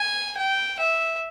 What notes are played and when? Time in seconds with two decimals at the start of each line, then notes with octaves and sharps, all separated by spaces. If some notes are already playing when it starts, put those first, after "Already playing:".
Already playing: G#5
0.37 G5
0.79 E5